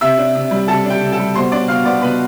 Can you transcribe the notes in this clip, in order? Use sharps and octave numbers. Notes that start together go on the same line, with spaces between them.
C3 E5 E6
D4
C3
G3
C3 A4 A5
D4
G4 G5
C3
A4 A5
G3
B2 C5 C6
D4 D5 D6
B2 F5 F6
B3 D5 D6
B2 B4 B5